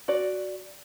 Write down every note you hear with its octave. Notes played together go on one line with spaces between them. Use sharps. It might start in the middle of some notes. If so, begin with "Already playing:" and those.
F#4 D5